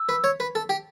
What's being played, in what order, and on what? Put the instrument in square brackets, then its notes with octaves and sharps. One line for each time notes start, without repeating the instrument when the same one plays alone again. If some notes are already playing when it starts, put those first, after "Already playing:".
Already playing: [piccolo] E6
[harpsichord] B4
C#5
B4
A4
G4